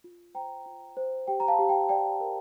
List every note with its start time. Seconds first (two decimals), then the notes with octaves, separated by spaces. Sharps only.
0.04 F4
0.35 C5 G5 A#5
0.66 F4
0.97 C5
1.27 G4 G5
1.40 A#5
1.48 F5 A5
1.59 G4
1.69 G5
1.89 D5 G5
2.20 A#4